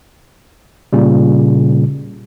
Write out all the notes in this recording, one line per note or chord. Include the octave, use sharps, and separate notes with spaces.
A#2 C#3 G3